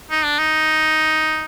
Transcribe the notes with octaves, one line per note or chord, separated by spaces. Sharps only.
D#4
D4
D#4